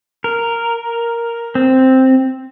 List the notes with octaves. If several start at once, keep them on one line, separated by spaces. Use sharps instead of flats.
A#4
C4